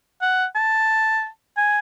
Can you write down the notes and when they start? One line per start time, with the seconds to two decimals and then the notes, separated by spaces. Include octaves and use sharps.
0.22 F#5
0.55 A5
1.57 G#5